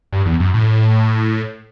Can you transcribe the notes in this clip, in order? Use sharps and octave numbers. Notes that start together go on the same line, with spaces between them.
G2
E2
F#2
A2